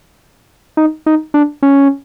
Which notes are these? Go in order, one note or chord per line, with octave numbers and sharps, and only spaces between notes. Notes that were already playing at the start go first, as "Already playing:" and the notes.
D#4
D#4
D4
C#4